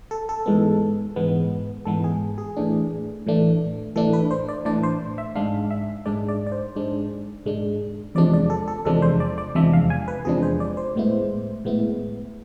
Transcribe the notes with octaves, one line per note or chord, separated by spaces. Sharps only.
A4
A4
G#2 E3 G#3 B3
G#2 E3 G#3 B3
G#2 E3 G#3 B3 A4
G#4
G#4
A2 E3 A3 D4
A2 E3 A3 D4
A2 E3 A3 D4 A4
B4
C5
D5
A2 E3 A3 D4 D5
C5
E5
G#2 G#3 D4 F5
E5
G#2 G#3 D4 D5
D5
D5
C5
G#2 G#3 D4
G#2 G#3 D4
E2 C3 F3 G#3 D4 D5
D5
A4
A4
E2 C3 F3 G#3 D4 A4
C5
D5
D5
E2 C3 F3 G#3 D4 E5
F5
G#5
B4
E2 C3 F3 G#3 D4 G#4
C5
D5
C5
A2 G#3 B3 E4
A2 G#3 B3 E4